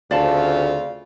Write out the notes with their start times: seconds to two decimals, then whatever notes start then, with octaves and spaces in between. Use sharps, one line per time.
0.11 D2 C#3 C4 F4 D5 F5 A5